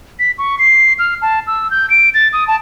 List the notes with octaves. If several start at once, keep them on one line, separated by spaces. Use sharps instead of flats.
B6
C#6
C7
F6
A5
E6
G6
D7
A6
D#6
A5